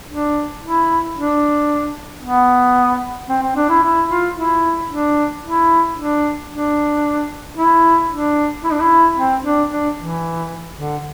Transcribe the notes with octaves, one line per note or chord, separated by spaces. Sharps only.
D4
E4
D4
B3
C4
C4
D4
E4
E4
F4
E4
D4
E4
D4
D4
E4
D4
E4
D4
E4
C4
D4
D4
E3
D3